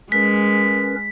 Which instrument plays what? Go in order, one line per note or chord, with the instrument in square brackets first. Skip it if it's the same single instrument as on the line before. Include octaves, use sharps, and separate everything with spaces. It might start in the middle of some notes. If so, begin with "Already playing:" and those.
[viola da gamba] G#3 [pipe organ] C#4 A#4 B4 [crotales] B6